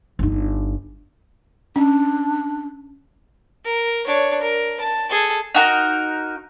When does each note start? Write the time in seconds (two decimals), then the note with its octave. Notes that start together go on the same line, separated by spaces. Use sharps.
0.19 G1 D#4
1.76 C#4 D4
3.65 A#4
4.06 D4 C#5
4.41 A#4
4.80 A5
5.10 G#4 A4
5.55 D#4 F#4 A#4